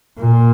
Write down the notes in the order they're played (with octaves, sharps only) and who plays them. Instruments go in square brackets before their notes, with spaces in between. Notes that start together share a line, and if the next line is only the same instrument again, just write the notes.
[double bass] A#2